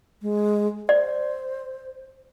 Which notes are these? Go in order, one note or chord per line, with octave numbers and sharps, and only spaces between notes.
G#3
C5 D5